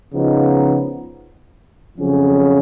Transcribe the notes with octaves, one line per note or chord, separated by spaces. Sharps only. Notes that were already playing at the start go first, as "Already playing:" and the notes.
C#3 F3 B3 D#4
F2 C#3 F#3 C#4